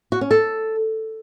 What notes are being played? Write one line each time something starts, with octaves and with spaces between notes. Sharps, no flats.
F#4
C#4
A4